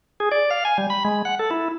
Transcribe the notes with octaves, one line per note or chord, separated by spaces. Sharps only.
G#4
D5
F5
G#5
G3
B5
G#3
F#5
A4
E4